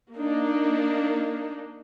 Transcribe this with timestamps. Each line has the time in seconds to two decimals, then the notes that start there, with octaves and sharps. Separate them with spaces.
0.15 A#3 D4 D#4